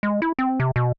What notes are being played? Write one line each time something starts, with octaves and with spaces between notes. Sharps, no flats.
G#3
E4
C4
C3
B2